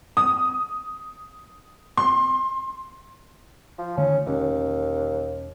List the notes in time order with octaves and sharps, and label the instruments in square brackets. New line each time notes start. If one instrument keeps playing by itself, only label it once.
[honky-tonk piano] D#6
C6
[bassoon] F3
[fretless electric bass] D3 D#3 A3 [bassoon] C#4
[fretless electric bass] E1 C#4 [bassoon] D#2